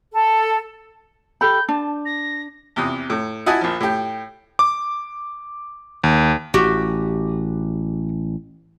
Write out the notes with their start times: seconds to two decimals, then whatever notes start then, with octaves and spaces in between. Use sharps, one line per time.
0.12 A4
1.41 G4 A4 B5 G6
1.68 D4 A5
2.05 A#6
2.76 E2 C3 D#6
3.10 A2
3.46 E4 F#4 D#5 G#5 A5
3.61 A#1 F3
3.80 A2 G4
4.59 D6
6.04 D#2
6.54 A1 F#4 G4